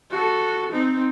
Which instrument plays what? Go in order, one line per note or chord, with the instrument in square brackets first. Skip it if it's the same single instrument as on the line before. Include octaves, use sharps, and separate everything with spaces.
[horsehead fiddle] F#4 A4
C4 D#4